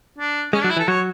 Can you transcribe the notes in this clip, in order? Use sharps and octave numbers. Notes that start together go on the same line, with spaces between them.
D4
G#3 C#4
D4
F#3
E4
E3
A4
F#3 C#5